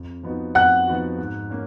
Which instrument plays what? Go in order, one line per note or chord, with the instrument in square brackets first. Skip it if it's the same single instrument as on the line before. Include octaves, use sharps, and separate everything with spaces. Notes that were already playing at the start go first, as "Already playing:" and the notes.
Already playing: [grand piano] F2
F3 B3 D#4 F#4
[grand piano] F2 [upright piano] F#5 F#6
[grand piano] F3 B3 D#4 F#4
G#2
A#3 C#4